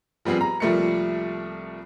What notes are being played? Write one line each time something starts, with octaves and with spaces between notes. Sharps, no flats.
F3 G3 B3 C4 G#4
A#5
C2 F3 G3 A3 A#3 C#7